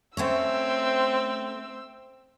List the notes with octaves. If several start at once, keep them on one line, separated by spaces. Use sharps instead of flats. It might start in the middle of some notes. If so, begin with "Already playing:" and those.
A3 C4 C#4 C#5 E6